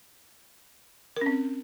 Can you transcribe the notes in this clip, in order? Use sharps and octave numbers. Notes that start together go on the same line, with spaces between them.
C4 C#4 A#4